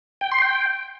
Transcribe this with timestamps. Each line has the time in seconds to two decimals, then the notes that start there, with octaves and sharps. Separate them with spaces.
0.21 G5
0.32 C6
0.42 G5